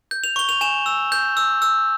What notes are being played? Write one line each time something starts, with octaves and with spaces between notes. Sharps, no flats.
G6
F7
C#6 G7
F7
G#5 E7
E6
G6
E6
E6